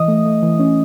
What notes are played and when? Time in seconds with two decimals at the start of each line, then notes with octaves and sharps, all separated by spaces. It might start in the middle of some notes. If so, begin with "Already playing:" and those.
Already playing: E3 D#5 D#6
0.08 A3
0.25 A3
0.42 E3
0.59 C#4